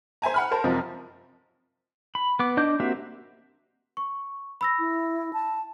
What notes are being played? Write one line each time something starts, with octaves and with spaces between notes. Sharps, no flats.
C5 E5 G#5 A#5
F#5 B5 F6
A#4 C5 A5
F#2 C3 F3 C4 D#4
B5
B3 D6
D4 D#5 D6 G6
A#3 C4 F#4 G4 E5
C#6
B5 E6 A#6
E4
A5